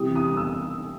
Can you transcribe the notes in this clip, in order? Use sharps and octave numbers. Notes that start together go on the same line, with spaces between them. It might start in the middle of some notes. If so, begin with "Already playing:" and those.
Already playing: C3 E3 G3 D#6
D#6
D#6
E6